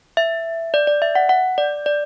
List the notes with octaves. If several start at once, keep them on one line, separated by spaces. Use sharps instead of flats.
E5
D5
D5
E5
F#5
F#5
D5
D5